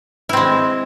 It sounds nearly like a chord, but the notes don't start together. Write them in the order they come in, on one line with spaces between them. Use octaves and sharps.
E4 C4 G#3